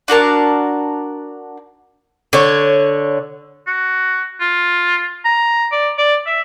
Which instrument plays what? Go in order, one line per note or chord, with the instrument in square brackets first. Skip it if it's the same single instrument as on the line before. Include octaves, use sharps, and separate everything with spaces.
[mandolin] D4 F#4 A#4 A5
[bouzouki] D3 C#5
[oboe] F#4
F4
A#5
D5
D5
E5